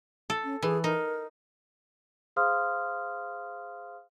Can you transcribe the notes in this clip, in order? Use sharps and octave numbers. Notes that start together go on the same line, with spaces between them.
A4
C#4
E3 G#4
D#4 A#4
G#4 C5 F5 C6 D#6 F6